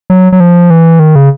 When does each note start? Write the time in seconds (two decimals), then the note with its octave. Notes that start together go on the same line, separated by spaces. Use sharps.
0.10 F#3
0.32 F#3
0.40 F3
0.70 E3
0.99 D#3
1.16 C#3